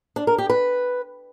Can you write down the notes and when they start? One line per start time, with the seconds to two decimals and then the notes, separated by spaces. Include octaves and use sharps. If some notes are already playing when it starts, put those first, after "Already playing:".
0.16 D4
0.27 A#4
0.38 G4
0.50 B4